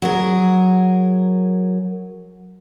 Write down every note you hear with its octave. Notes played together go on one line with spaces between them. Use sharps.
F#3 G#4 A#4